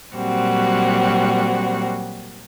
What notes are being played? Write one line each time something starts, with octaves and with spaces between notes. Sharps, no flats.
A#2 F#3 G3 C4 F#4